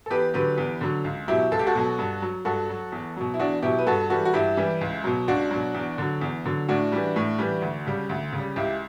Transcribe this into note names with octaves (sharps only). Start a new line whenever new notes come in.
A4
E2 G4 B4
D3 F#3 G4 B4
E2
D3 F#3
C#2
B2 F#3 E4 G4
C#2 A4
G4
F#4 A4
B2 F#3
G2
F#3
G2 F#4 A4
F#3
E2
B2 F#3
E4
E2 D4 F#4
B2 F#3 E4 G4
B4
G2 F#4 A4
E3 G3 F#4 A4
F#4
G2 E4 G4
E3 G3
C#2
B2 F#3
C#2 D4 F#4
B2 F#3
E2
D3 F#3
E2
D3 F#3
A2 D4 F#4
E3 G3
A2
E3 G3
D2
C#3 G3
D2
C#3
G3
C#2 E4 G4